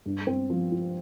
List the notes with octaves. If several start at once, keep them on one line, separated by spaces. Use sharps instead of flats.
G2
C4
F3
F4